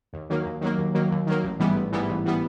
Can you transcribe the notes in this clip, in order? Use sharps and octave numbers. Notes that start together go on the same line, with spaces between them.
D#2
D#3 F#3 A#3
D#2
D#3 F#3 A#3
D#2
D#3 F#3 A#3
D#2
D#3 F#3 A#3
A1
G#2 E3 G3 B3
A1
G#2 E3 G3 B3
A1
E3 G3 B3